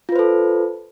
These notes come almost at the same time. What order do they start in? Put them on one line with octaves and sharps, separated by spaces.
F4 B4 C5 A4